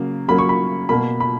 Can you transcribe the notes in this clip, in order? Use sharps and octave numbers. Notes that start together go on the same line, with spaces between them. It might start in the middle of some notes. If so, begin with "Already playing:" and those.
Already playing: C#3 F#3 A#3
C#3 F#3 A#3 B5
C#6
B5
B2 A#3 B5
B5